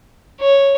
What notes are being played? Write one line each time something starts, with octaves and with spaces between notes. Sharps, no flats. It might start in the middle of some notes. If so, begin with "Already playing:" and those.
C#5